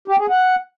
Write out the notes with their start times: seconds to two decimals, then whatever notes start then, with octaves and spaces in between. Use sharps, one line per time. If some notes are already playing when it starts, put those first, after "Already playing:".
0.08 G4
0.19 G#4
0.30 F#5